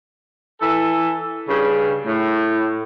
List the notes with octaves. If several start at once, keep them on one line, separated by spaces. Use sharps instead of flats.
E3 A4
G2 C#3
A2